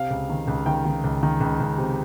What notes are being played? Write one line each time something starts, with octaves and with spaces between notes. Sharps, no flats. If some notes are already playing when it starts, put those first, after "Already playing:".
Already playing: C3 F5
C#2
D#3
C#2
D#3 G5
D#3
C#2
D#3
C#2
C#2
C3